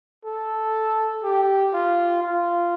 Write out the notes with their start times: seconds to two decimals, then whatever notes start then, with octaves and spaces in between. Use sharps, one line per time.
0.26 A4
1.23 G4
1.73 F4
2.23 F4